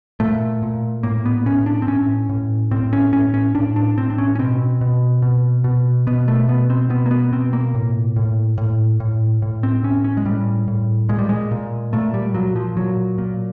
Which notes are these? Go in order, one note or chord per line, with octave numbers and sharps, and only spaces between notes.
A#2 A3
A#2
A2 A#3
B3
A2 C#4
D4
C4
A2 C#4
A2
A2 C4
C#4
A2 C#4
C#4
A2 D4
D4
A2 C4
D4
C#4
C#4
B2 C4
B2
B2
B2
B2 B3
A3
B2 B3
C4
B2 B3
A#3
B3
B2 C4
A#3
A2
A2
A2
A2
A2
C4
A2 C#4
C#4
G#3
A2 G3
A2
A#2 G#3
G3
G#3
A#2
A#2 A3
G3
A#2 F#3
F3
A#2 F#3
A#2